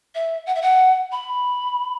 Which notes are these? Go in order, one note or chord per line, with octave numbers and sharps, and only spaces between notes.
E5
F#5
E5
F#5
B5